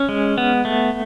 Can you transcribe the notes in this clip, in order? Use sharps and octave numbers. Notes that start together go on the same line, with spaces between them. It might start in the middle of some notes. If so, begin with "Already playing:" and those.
Already playing: C#4
G#3
B3
A3